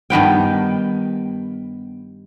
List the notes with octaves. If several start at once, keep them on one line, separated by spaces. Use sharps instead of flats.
G2 D#3 B3 G5